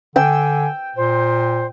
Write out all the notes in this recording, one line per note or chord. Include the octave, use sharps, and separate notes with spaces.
D3 G5 G#5 E6
A#2 C5